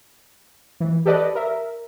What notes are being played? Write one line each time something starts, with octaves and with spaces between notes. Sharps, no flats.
E3
G4 A4 B4 D5 D#5
A#4 E5